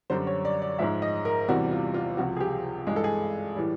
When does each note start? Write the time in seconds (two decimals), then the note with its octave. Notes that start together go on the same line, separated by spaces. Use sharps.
0.10 F#2 D3 G3 C5
0.27 C#5
0.45 D5
0.62 D5
0.79 G#2 F3 G#3 E5
1.02 D#5
1.25 A#4
1.48 E2 C3 E3 G3 F#4
1.71 F4
1.94 F4
2.17 C#2 C3 F3 F#4
2.37 G#4
2.40 G4
2.87 G2 E3 G#3 G#4
2.96 A4
3.04 G#4
3.56 A2 E3 G3